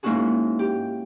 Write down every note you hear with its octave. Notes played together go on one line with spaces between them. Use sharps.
G#2 A#3 C#4 E4 F#4 G#4
G4